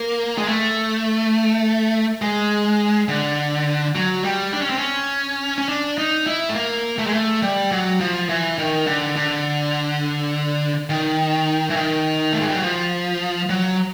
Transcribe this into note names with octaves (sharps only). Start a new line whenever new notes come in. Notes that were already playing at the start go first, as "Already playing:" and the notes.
Already playing: A#3
G#3
A3
G#3
D3
F#3
G3
D4
C#4
C4
C#4
C#4
D4
D#4
E4
A3
A#3
A3
G#3
A3
G3
F#3
F3
E3
D#3
D3
D3
D#3
E3
D#3
A3
G#3
G3
F#3
F3
F#3